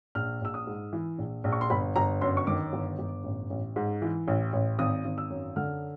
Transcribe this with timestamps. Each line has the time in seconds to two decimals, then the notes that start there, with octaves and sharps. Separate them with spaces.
0.15 A#1 F6
0.42 A#1 E6
0.54 D#6
0.67 G#2
0.93 E3
1.18 A#1
1.44 A#1
1.53 C#6
1.61 C6
1.70 G1 B5
1.96 G1 A#5
2.21 F#2 C6
2.37 C#6
2.47 D#3 D6
2.73 G1
2.99 G1
3.24 A1
3.50 A1
3.76 G#2
4.02 E3
4.28 A1
4.53 A1
4.79 G#1 D#6
5.05 G#1
5.18 E6
5.30 F#2
5.56 D3 F6